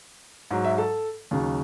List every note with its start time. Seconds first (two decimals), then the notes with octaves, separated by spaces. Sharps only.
0.51 G#2 F#3
0.64 E5
0.78 A4
1.31 D#2 C#3 F#3